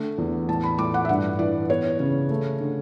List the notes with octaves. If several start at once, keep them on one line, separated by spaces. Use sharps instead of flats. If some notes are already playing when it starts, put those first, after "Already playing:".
Already playing: D3 A3
E2
A2 A5
B5
A2 D6
F#5
E5
G2 F#5
E3 D5
B3 C#5
C#3
A3
D3